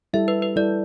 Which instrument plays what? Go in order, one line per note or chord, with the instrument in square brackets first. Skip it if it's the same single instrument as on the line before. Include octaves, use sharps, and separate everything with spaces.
[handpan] G3 E4 A4 [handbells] E5
[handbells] B4
B4
[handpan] G3 E4 A4 [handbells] D5